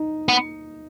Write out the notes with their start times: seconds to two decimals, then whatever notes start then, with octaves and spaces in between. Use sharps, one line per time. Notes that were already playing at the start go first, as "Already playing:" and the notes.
Already playing: D#4
0.29 B3